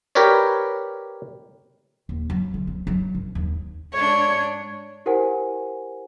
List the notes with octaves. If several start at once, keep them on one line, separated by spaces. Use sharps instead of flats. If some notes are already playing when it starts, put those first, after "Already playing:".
G4 A#4 B4 C#5 D5
D#2
F#3
D3
C4
F#3
G#1
D#2
G#2 D4 C#5
E4 G4 A#4 C5 F#5 G#5